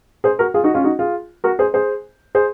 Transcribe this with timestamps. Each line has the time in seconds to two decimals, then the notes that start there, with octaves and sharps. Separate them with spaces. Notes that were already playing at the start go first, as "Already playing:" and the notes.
0.24 G#4 C5
0.39 F#4 A#4
0.54 F4 G#4
0.64 D#4 F#4
0.74 C#4 F4
0.84 D#4 F#4
0.99 F4 G#4
1.44 F#4 A#4
1.59 G#4 C5
1.74 G#4 C5
2.35 G#4 C5